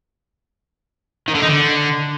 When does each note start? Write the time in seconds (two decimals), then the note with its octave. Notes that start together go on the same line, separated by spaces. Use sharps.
1.28 D#3
1.35 D3
1.41 D#4
1.48 D3